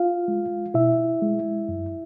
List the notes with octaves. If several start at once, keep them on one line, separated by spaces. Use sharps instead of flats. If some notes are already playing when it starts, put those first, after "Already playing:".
Already playing: F4 F5
G#3
B2 E4 E5
G#3
F#2